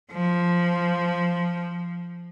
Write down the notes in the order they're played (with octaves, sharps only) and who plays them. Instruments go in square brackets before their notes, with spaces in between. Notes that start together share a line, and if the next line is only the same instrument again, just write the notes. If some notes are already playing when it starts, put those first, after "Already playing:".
[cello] F3